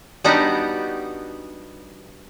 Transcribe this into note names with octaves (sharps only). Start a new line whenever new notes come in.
G3 B3 D4 D#4 F#4 G4